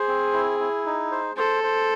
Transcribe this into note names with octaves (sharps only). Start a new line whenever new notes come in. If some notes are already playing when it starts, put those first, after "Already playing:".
Already playing: G#4 C5
C4
E4
E4
D#4
C5
A4 C5
C5